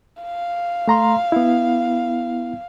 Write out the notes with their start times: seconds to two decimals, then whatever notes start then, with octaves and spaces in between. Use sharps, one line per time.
0.22 F5
0.88 A3 A#5 C6
1.32 B3 E4